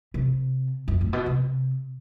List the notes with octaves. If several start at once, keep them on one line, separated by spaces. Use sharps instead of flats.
C3
F2
A2
B2
C3